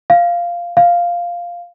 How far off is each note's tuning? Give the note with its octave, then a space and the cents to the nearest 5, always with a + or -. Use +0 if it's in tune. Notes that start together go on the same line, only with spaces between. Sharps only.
F5 -10
F5 -5